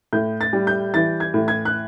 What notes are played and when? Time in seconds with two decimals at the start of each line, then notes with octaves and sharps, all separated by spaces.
0.13 A2 G6
0.41 A6
0.53 G3
0.67 G6
0.94 E3 A6
1.20 G#6
1.34 A2
1.48 G#6
1.65 F#6